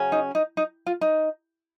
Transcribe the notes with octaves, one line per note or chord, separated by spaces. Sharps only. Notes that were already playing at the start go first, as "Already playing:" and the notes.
Already playing: C#3 F#3 C#4
D#4
D#4
D#4
F4
D#4